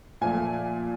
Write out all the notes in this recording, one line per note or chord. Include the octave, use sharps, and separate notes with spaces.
A#2 F3 A3 G#5